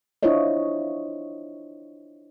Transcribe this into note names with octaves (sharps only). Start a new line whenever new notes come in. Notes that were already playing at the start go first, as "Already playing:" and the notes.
D4 E4 F4 C5 C#5 D#5